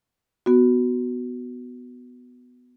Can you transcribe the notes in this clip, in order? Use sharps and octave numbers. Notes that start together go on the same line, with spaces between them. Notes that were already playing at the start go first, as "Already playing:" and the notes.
B3 F#4